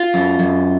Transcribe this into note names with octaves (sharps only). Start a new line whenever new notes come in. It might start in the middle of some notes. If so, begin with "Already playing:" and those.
Already playing: F4
F#2
F#2